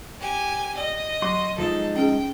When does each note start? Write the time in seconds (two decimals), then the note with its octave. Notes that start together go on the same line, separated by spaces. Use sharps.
0.20 G4 G#5
0.77 D5 D#5
1.22 F#3 F#4 C6
1.58 F3 G#3 D#4 F4 A4
1.95 C#4 G#4 G5